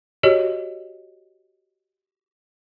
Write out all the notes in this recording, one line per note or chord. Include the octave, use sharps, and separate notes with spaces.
F#4 G4 C#5 D#5